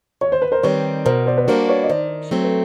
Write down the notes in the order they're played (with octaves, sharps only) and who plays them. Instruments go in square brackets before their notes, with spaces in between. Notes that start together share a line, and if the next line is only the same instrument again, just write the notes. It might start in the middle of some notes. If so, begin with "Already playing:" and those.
[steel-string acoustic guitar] D#2 [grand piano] C#5
[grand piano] C5
B4
A#4 C5
[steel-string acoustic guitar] D#3 G3 C4 [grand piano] B4 C#5
[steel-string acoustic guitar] B2 [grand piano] A#4 C5
[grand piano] C5 D5
B4
[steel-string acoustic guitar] G3 A#3 D4 F#4 [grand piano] A#4 C5
[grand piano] B4 C#5
D#5
[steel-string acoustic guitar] D#3 [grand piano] C5 D5
[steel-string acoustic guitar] F#3 A3 C4 [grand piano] C5
[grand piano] B4